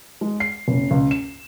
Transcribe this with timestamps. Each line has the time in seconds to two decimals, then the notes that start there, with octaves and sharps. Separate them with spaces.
0.21 G#3
0.40 C7
0.68 F#1
0.91 C#2
1.11 E7